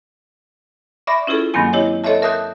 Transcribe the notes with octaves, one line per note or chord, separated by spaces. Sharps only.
D5 E5 B5 C#6 D6 A#6
C#4 E4 F4 G#4 A4
G2 D#3 F#3 A#3 C4 G#5
E4 G4 C#5 D#5
A4 C#5 D#5 E5 A5
A#4 E5 A5 D#6 F#6 G6